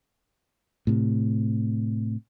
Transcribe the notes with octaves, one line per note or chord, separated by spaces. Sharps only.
A2 C3